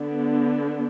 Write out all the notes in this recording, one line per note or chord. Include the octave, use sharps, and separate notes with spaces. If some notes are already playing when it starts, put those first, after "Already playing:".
Already playing: D3 B3 D4